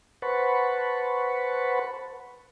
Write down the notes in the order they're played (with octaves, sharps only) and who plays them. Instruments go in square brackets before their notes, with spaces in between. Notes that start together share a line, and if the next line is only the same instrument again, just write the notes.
[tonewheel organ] B4 C5 F#5 A5 B5 C#6